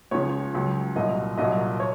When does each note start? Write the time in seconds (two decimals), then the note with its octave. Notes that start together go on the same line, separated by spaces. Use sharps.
0.11 C#2 C#3 F3 C#5
0.54 C#2 C#3 F#3
0.96 C2 A#2 F#3 D#5
1.38 C2 A#2 F#3 D#5
1.80 C#5